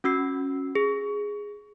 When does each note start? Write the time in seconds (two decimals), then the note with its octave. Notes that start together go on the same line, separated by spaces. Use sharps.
0.04 C#4 F#4 E6 C7
0.75 G#4